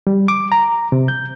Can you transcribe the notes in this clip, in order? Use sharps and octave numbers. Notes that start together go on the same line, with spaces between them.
G3
D6
A#5
C3
G6